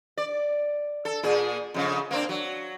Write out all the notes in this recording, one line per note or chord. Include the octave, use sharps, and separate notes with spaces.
D5
A4
A#2 G#4
F2 C#3
A#3 C4 D4
F#3